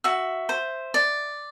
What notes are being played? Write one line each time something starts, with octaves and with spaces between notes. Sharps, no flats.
F#4 E5
C5
D5